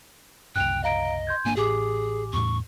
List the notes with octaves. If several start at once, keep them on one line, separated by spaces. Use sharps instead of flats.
F#1 C2 G5 F#6 F7
D#5 F5 A#5 D7
C6 G6 G#6
G#1 A#3 D4 G#5
A1 G4 G#4 G#5 D6
E2 A2 C#6